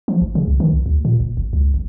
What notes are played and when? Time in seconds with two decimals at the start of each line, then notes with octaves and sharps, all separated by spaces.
0.08 F3
0.21 G1
0.35 C#3
0.48 C2
0.60 D#3
0.73 B1
0.86 D2
1.05 A#2
1.20 F#1
1.37 G1
1.53 C#2
1.74 G1